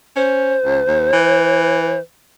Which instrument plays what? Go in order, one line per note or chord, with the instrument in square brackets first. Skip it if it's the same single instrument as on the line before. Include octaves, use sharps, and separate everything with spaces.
[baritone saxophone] C#4 [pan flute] C5
[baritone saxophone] C#2
D#2
E3